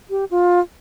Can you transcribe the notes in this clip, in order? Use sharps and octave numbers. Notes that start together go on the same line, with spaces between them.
G4
F4